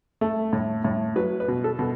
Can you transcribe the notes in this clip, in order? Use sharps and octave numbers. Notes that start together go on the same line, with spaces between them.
A3
A2
A2
F#3 B4
B4
B2
A4
B2